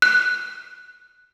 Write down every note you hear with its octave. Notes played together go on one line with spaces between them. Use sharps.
F#6